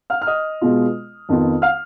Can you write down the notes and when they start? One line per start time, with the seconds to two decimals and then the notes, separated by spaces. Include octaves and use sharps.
0.10 F5 F6
0.22 F6
0.27 D#5 D#6
0.61 B2 G#3 B3 F4
1.29 F2 D#3 B3 F4
1.62 F5 F6